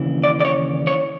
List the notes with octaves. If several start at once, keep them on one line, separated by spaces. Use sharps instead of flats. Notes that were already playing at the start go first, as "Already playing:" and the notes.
Already playing: D#2 C#3 E3
D5
D5
C#5
C#5